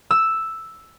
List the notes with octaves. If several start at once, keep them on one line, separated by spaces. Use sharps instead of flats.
E6